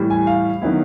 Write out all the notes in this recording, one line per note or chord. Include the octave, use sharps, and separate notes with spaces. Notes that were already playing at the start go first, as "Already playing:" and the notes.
Already playing: A2 E3 G3
G#5
F5
D#3 F#3 B3 E4